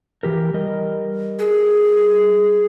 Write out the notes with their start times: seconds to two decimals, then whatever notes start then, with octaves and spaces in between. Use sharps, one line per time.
0.23 E3 G4 A#4
0.54 G3 A#4 D#5
1.39 G#4